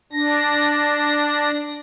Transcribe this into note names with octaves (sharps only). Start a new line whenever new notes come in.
D4 A#6